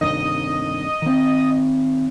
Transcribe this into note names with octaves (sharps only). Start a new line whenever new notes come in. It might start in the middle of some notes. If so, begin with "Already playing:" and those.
C2 G2 D#3 D#5
D#3 C4